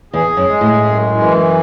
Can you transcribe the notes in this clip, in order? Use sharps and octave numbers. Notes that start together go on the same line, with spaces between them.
E2 G#4
F#2
G#3
A2
F#2
E3